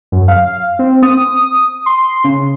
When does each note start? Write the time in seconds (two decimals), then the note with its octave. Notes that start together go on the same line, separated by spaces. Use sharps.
0.12 F#2
0.28 F5
0.79 C4
1.03 D#6
1.86 C6
2.24 C#3